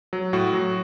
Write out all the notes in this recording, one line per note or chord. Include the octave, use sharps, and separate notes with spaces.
F#3
A2 F#4
F#3